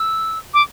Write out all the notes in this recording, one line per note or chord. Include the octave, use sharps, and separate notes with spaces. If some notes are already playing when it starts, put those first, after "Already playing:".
Already playing: E6
D6